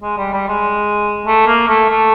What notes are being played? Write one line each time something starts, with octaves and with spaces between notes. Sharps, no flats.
G#3
G3
G3
G#3
A3
A#3
A3
A3